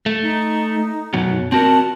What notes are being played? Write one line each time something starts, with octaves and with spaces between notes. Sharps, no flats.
A3
D#4
F#2 B2 F#3
C4 F#4 A#4 A5